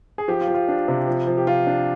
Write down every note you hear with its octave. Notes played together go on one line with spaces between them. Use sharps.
G#4
F3 G4
F4
F3
F4
D4
C3
F3
F3
G4
F3 F4
D4